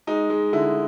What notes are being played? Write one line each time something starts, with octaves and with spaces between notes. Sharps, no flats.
G#3 D#4
G#3
D3 E4